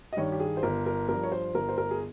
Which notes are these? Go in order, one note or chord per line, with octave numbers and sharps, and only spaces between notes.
D#5
G2 D#3 C#5
G4
G#4
C5
G1 A#4
A#4
G2 F3 A#4
C#5
C5
G1 A#4
C5
A#4
G#4